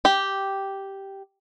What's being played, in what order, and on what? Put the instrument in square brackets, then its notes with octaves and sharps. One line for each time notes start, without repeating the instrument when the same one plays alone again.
[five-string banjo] G4